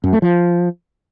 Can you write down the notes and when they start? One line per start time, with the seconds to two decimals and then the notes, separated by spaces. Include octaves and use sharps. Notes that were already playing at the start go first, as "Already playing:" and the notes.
0.04 F#2
0.13 A3
0.22 F3